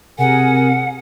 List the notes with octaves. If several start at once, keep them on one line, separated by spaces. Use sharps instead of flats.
C3 G#4 A#4 F#5 G#5